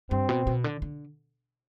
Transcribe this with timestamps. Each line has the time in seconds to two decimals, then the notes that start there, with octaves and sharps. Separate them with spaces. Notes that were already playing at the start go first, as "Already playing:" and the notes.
0.11 G2 C4
0.29 B2
0.47 B2
0.64 D3
0.82 D3